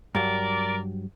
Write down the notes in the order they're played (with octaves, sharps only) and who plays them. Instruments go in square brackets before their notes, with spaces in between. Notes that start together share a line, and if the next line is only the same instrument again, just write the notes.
[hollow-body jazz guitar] G2 F#3 [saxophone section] A#4 D5